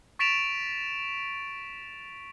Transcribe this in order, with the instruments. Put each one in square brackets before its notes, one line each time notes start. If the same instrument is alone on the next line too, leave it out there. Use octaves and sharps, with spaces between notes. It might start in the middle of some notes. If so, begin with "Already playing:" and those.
[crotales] C#6 A6 B6 D7 E7 F7